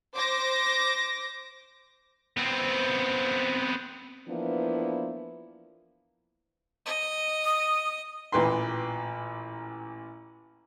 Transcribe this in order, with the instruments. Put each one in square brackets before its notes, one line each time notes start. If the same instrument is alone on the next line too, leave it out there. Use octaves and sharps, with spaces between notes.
[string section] C5 D6 A#6
[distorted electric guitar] B3 C4
[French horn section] E3 F3 A#3 B3 D4 E4
[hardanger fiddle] D#5
[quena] D#6
[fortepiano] A1 A#2 B4 G5 C6